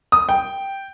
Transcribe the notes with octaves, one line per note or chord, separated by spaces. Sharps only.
D#6
G5